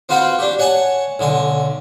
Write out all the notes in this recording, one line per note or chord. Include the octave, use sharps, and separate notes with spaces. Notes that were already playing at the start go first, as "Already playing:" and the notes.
C4 F4 F#4 B4 F5 G5
D4 G4
C#5 F#5 G#5 A5
B1 D3 G#5